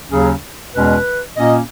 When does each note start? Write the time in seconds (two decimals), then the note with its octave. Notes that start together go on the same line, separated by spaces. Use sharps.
0.09 D#2 C#3 F#3 C#4 G#4
0.73 E2 B2 G#3 C#4 B4
1.37 A#2 A#3 C#4 D#5